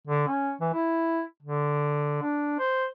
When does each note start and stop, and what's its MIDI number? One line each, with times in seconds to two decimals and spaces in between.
0.07 0.26 50
0.28 0.53 61
0.61 0.70 52
0.74 1.22 64
1.43 2.21 50
2.22 2.56 62
2.59 2.86 72